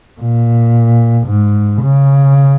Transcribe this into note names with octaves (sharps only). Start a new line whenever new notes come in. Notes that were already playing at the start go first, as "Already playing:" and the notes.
A#2
G#2
C#3